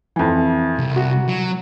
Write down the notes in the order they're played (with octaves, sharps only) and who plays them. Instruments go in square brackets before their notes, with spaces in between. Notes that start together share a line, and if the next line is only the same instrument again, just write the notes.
[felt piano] F2 E3
[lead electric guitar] C2
[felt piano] F#4
[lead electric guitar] F#3